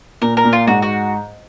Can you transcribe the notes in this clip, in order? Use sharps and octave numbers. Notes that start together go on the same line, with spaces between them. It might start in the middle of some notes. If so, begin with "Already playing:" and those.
A#2 A#4
A#4
A#2
F4
G#2 F#4
F#4